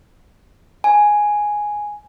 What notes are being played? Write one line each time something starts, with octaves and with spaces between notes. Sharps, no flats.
G#5